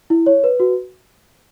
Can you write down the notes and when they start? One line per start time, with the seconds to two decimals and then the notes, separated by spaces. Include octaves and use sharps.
0.10 E4
0.26 C#5
0.44 B4
0.60 F#4